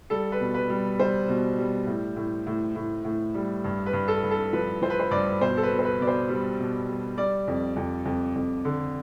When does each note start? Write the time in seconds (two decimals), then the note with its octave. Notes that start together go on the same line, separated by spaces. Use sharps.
0.10 G3 A4
0.32 B4
0.40 B2
0.54 B4
0.70 G3
0.99 G3 C5
1.29 B2
1.58 G3
1.87 A2
2.16 A2
2.47 A2
2.76 A2
3.05 A2
3.34 G3
3.64 G2
3.86 B4
3.93 G2
4.08 A4
4.23 G2
4.31 A4
4.53 F3 B4
4.82 F3 C5
4.90 B4
4.99 C5
5.11 G2 D5
5.40 B2 C5
5.57 A4
5.63 B4
5.71 B2
5.79 C5
5.85 B4
6.00 B2 D5
6.07 C5
6.29 G3
6.59 B2
6.89 G3
7.17 G3 D5
7.48 F2
7.76 F2
8.05 F2
8.36 F2
8.65 D3